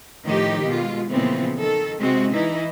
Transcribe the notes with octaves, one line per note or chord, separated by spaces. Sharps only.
A2 D#3 F3 D#4 G4
B2 G#3 F4
A#2 C#3 E3 F3 B3 C4
D#3 A4
C3 G#3 C4 F#4
E3 D#4 E4